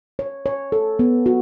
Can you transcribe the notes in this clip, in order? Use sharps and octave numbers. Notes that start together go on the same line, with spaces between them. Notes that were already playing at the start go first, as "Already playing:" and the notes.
C#5
C#5
A4
B3
F#4